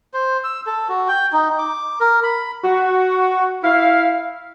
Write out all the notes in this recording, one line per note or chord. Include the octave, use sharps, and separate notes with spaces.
C5
E6
A4
F#4
G5
D#4
D6
A#4
B5
F#4
E4 F5